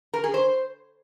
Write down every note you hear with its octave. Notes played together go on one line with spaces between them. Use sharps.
A#4
G#4
C5